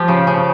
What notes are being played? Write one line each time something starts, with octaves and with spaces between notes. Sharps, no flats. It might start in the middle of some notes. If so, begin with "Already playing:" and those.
Already playing: F3 G4
C#3
C#3